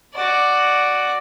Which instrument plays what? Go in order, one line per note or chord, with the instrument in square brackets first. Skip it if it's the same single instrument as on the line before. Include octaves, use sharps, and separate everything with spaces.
[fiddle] F#4 D5